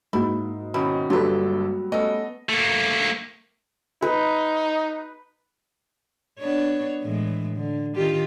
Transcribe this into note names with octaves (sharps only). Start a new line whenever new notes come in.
G#2 G#3 A#3 E4 F#4
B2 D#3 C#4 E4
G1 G2 F#3 G3 F4 A4 B4
A3 B3 C#4 A4 D#5
A3 A#3
D#4 B4
B3 D4 C#5
A2 E3 G#3
D3
D#3 F4 G4